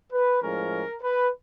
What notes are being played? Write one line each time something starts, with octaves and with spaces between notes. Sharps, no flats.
B4
A2 F3 G#3 C#4 A#4
B4